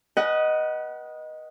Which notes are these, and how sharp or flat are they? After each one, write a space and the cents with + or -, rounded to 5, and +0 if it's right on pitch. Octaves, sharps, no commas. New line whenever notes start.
B4 -30 D#5 +0 F#5 +20